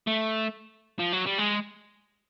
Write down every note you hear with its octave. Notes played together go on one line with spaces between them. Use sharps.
A3
F3
F#3
G3
G#3